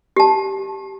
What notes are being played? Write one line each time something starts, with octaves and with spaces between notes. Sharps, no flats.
G4 A5